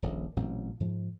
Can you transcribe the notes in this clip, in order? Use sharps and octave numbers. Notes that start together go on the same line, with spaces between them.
D#1 A#1
A1 A#2 F#3 C4
G#2 F3